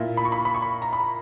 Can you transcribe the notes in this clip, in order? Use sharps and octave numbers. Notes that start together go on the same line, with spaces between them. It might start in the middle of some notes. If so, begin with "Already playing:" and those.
Already playing: A#2 A#3 E4
B5
C#6
B5
B5
C#6
B5
A#5
B5